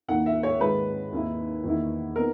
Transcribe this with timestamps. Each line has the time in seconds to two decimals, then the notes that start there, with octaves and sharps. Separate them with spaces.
0.08 D#2 D#3 A#3 E4 F#5
0.26 E5
0.43 C#5
0.60 G#2 D#3 G#3 D#4 B4
1.12 D#2 D#3 A#3 E4
1.64 E2 D#3 A#3 E4
2.16 B3 D#4 A#4